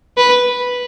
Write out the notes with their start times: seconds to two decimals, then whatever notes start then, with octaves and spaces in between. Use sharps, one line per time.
0.18 B4